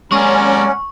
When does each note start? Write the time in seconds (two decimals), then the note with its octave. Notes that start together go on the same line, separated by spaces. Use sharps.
0.12 G#3 A#3 C#4 D5 F#5 A#5 C#6